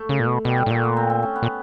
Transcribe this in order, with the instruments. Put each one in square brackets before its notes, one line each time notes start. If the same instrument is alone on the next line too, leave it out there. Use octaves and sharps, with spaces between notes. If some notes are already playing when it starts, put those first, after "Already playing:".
Already playing: [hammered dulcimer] A3
[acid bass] C#3
A#2
B2
[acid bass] B2 [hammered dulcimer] G3
[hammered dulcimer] G3
[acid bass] A2
[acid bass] A#2 [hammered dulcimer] A3
[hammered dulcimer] B3
C4
C4
C#4
B3
[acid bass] A#2